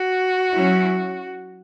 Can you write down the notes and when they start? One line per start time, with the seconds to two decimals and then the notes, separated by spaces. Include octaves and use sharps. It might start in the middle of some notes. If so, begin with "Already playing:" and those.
Already playing: F#4
0.53 F#3 C#4 E4